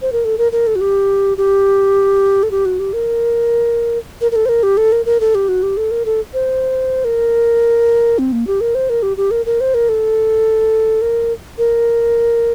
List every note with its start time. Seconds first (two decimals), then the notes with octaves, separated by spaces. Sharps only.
0.02 C5
0.12 A#4
0.25 A4
0.38 A#4
0.52 A#4
0.67 A4
0.76 F#4
0.81 G4
1.38 G4
2.43 A4
2.51 G4
2.65 F#4
2.79 G4
2.93 A#4
4.21 A#4
4.32 A#4
4.36 A4
4.46 C5
4.49 A#4
4.63 G4
4.77 A4
4.92 A#4
5.06 A#4
5.20 A4
5.35 G4
5.48 F#4
5.63 G4
5.77 A4
5.91 A#4
6.05 A4
6.34 C5
7.05 A#4
8.19 C4
8.32 A#3
8.47 G4
8.61 A#4
8.75 C5
8.90 A#4
9.03 G4
9.17 G4
9.31 A#4
9.46 A#4
9.61 C5
9.74 A#4
9.89 A4
11.02 A#4
11.58 A#4